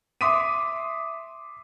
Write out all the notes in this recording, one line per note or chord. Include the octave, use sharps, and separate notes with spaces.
E5 C6 D6 D#6 B6 D#7